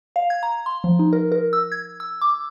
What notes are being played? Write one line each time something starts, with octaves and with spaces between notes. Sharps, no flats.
F5
G#6
A#5
C6
F3
D#4
A#4
A#4
E6
G#6
E6
D6